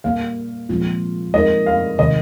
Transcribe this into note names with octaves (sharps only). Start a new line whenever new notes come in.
A#2 G3 A#3 F5
A#2 F3 G#3 C4 F4
G#3 C4 D#4 A#4 D#5
F5
C3 D#3 G#3 D#5